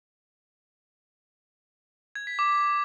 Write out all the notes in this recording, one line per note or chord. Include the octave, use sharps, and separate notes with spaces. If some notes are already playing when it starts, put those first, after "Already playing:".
G#6
B6
D6